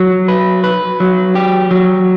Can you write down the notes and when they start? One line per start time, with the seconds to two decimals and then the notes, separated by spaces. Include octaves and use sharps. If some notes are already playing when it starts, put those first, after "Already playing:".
Already playing: F#3
0.28 B4
0.64 B4
1.00 F#3
1.35 G4
1.71 F#3